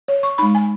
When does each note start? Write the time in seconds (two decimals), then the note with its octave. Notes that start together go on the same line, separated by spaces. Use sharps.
0.08 C#5
0.23 C#6
0.38 G#3 D#4 B5
0.55 G#5